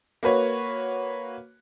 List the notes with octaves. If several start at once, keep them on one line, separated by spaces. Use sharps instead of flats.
A#3 F#4 B4 C#5